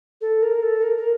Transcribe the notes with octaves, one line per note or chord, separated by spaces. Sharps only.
A4
A#4
A4
A#4
A#4